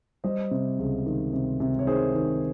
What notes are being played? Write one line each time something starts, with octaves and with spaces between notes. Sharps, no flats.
G3 C5 D#5
C3
C#2
D#3
C3
C3
C#5
D#3 G#4 C5
D#3